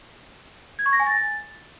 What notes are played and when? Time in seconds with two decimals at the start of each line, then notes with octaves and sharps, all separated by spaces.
0.79 G#6
0.86 C#6
0.93 A#6
1.00 G#5
1.07 A6